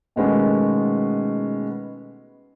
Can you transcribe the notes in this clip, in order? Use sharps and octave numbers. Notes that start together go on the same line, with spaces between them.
B2 D#3 G#3 A3 B3 C#4